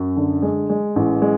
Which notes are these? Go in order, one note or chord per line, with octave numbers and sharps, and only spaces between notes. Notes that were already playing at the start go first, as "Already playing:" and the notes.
Already playing: F#2
D3
G#3
G#3
A1
G#3